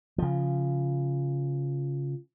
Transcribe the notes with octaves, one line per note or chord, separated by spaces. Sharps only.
C#3 F3